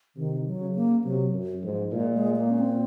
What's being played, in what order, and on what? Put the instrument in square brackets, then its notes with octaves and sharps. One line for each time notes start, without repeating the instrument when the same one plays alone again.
[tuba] C3 [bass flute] D#3
[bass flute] F#3
[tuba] C#3
[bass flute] A#3
[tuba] C3 [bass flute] F#3
[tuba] F#2
[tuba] G#2 [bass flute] F3
[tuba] A#2 [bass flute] G#3
[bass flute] G#3
A#3
C#4
C4